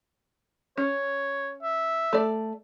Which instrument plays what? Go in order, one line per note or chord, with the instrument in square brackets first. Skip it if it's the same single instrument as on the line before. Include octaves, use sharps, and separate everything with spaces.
[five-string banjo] C#4 [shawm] C#5
[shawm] E5
[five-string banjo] A3 D5